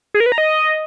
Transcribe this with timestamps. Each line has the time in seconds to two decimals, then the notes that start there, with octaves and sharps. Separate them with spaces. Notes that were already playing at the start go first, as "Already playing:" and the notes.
0.14 G#4
0.20 A#4
0.26 B4
0.32 A#5
0.38 D#5